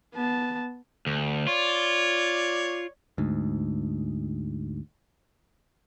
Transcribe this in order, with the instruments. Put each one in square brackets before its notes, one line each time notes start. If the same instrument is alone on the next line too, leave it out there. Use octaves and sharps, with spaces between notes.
[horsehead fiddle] B3 A5
[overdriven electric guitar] D2
[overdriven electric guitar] F4 [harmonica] C#5 D5
[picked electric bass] D2 G#2